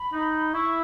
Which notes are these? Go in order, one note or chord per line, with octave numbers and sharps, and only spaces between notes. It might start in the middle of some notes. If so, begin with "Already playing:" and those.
Already playing: B5
D#4
E4 C#6